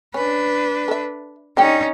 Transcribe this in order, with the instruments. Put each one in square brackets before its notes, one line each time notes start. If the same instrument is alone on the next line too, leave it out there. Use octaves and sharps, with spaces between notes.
[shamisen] C#4 [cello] D4 B4
[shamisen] A4 E5
[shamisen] D3 G4 G5 [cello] C#4 D#4